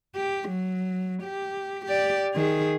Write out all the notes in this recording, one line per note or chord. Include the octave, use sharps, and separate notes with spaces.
G4
F#3
G4
G4 D5
D#3 G#4